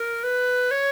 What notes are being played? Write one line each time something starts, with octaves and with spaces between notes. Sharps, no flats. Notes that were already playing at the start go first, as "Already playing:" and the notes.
Already playing: A#4
B4
C#5